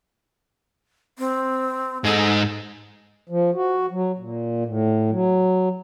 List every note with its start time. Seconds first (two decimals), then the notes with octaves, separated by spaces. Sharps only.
1.18 C4
2.04 G#2 D#4 A4
3.29 F3
3.55 F#4
3.91 F#3
4.18 A#2
4.66 A2
5.10 F#3